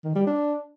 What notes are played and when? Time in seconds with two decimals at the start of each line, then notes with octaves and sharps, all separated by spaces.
0.04 D#3
0.15 G3
0.26 D4